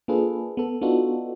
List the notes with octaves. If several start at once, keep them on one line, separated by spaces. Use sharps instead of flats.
A#3 D4 F4 G#4 A4 B4
B3 A4
B3 D4 D#4 F4 F#4 A4